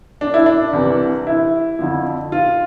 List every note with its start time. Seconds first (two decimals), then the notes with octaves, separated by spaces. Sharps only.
0.21 D4
0.34 E4
0.46 D4
0.73 C2 C3 E3
1.27 E4
1.79 F2 D3 F3
2.32 F4